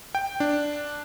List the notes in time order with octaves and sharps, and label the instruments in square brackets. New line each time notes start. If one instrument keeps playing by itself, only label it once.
[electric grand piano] G5
D4